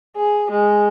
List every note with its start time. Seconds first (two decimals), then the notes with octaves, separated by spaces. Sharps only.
0.16 G#4
0.51 G#3